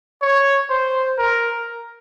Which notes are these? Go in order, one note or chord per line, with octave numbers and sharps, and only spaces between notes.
C#5
C5
A#4